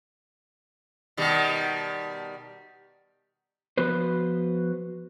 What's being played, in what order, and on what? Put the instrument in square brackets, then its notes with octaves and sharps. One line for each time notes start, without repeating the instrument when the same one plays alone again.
[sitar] B2 D#3 G3
[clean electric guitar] F3 B3 F#4 B4 C5